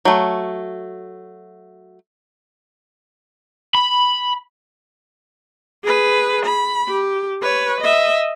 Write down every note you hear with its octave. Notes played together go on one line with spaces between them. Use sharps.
F#3 A3
B5
G#4 B4
B5
G4
B4 C#5
D#5 E5